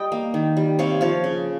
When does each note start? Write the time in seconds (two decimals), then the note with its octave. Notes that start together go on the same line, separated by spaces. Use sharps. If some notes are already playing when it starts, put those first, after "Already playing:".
Already playing: G3 D#5 G5
0.12 A#3
0.34 D#3
0.57 G3
0.79 C3 C#5 F5
1.01 F3 C#5 F5
1.24 C#3